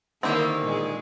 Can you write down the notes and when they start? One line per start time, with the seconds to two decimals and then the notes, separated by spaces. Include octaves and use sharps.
0.23 D3 D#3 A#3 C4 E4 G4
0.63 A#2 G#3 G#4